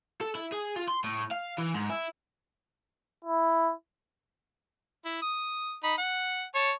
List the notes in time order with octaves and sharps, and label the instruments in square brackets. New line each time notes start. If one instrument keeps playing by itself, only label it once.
[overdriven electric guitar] A4
E4
G#4
F4
C6
A2
F5
E3
G#2
E4
[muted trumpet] E4
[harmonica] E4
D#6
D#4 B5
F#5
C#5 A5 C#6